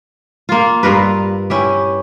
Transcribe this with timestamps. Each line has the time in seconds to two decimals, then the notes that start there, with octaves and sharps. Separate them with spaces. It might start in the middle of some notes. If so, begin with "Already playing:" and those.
0.49 A#3 F4
0.83 G2 F4 A#4 B4
1.50 C#4 E4 G4